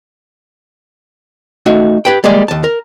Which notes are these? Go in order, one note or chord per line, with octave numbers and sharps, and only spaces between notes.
A3 D#4 F#4
G4 B4 G5
G3 G#3 A#3 G#4 D5
D#2 A5
A#4